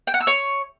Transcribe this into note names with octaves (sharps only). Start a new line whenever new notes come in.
G5
F#5
E6
C#5